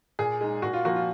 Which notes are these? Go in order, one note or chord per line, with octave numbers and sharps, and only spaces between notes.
A#2 G#4
G#3 D#4
A#2 F#4
F4
F3 A#3 F4 F#4
F4